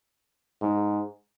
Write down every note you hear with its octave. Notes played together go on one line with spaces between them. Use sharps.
G#2